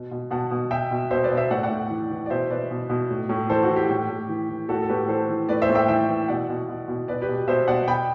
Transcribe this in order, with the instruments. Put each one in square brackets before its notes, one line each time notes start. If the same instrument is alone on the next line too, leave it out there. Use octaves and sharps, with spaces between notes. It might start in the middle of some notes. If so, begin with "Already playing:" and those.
Already playing: [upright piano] B2
B2
B2 F#5 A5
B2
B2 E5 G5
B2
B2 C5 E5
B4 D5
B2
C5 E5
A2 D5 F#5
D5 F#5
A2
E3
E3
D5
B2 C5 E5
B2 B4 D5
B2
B2
A2
A2
E3 A4 C5
F#4
E3
G4
A2
A2
E3
E3
A2 F#4 A4
A4
A2 G4 B4
E3 A4 C5
E3
A2 B4 D5
C5 E5
A2
E5 G5
E3 E5 G5
E3
B2 D5 F#5
B2
B2
B2
B2 B4 D5
G4 B4
B2
G4
B2 C5 E5
B2 D5 F#5
B2 G5 B5